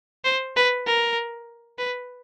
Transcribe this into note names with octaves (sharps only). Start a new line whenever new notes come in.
C5
B4
A#4
B4